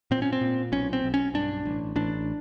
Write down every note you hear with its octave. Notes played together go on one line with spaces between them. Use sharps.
A#2 C4
C#4
C4
A#2
B1 C#4
C4
B1
C#4
G2 D4
A1
A1 D4